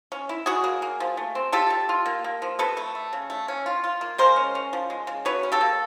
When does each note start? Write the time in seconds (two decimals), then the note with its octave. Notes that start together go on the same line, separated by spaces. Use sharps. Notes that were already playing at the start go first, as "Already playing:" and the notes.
0.12 C#4
0.29 E4
0.46 F#3 F#4 G#4
0.64 A#3
0.82 A#3
1.00 F3
1.17 A3
1.35 C4
1.52 F4 G4 A4
1.70 G3
1.89 F4
2.06 A#3
2.24 A#3
2.42 F3
2.59 C3 A4 B4
2.77 A3
2.95 A3
3.13 C#3
3.30 A3
3.48 C#4
3.66 F4
3.84 F4
4.01 A#3
4.18 G#3 A#4 C5
4.36 C#4
4.55 C#4
4.73 F3
4.90 G#3
5.07 C#3
5.25 F#3 B4 C#5
5.43 C#4
5.52 G4 A4
5.61 A#3